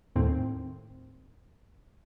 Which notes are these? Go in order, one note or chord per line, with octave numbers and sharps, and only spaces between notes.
D#2 A2 C4